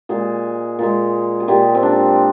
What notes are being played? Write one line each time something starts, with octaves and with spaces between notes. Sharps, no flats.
A#2 G#3 G#4
A#2 G#3
G#4
A#2 G#3 G4
C4
D4